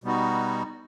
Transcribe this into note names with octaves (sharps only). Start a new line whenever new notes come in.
B2 G3 B3 D#4 F#4